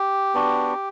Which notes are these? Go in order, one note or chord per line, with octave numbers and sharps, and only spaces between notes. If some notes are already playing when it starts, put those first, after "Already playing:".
Already playing: G4
B3 D4 F#4